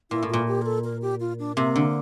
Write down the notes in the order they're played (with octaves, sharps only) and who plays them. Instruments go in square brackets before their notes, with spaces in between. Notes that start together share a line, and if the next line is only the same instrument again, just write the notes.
[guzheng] A#2 [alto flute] E4
[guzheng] A2
[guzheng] A#2 [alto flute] F4
[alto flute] G4
A#4
A4
A#4
G4
F4
D4
[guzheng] C3 [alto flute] A#3
[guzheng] D3